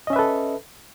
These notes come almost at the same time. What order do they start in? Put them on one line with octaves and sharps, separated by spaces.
D#5 C#4 E5 B4 A4